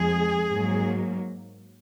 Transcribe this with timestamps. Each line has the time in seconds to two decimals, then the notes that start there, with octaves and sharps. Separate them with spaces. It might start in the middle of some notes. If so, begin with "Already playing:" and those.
Already playing: F2 F3 G#3 G#4
0.49 G#2 F#3 A#3